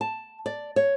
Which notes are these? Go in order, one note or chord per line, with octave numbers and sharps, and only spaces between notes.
A5
D5
C#5